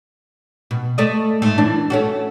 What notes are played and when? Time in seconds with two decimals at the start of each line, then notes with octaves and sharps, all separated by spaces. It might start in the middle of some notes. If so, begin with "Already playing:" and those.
0.71 B2
0.98 A3 D5 D#5
1.42 G#2 A3
1.58 F#2 E3 D4
1.90 A3 C#4 F#4